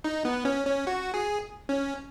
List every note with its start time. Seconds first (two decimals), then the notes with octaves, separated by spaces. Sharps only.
0.04 D#4
0.25 B3
0.45 C#4
0.67 C#4
0.87 F#4
1.14 G#4
1.69 C#4